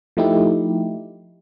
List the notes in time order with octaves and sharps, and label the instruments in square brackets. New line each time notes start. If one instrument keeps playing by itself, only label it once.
[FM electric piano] F3 A3 D#4 E4 G4